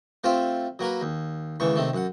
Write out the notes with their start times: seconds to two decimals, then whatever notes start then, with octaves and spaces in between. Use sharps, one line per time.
0.24 A3 C4 F4 G4 C5 F5
0.79 F#3 A#3 A#4 B4
1.01 D#2
1.60 D#2 G#2 C#3 E3 C#6
1.76 C3 D#3 A3
1.94 F#2 F#5